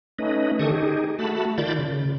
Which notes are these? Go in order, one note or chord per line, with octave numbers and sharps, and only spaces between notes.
A3 C#4 D#4 B4 D#5
D3 D#3 G4 A4 C#6 D#6
D#4 G4 G#4
A3 F#4 A5 B5
D#3 F4 D5 B5 G6 A6
C#3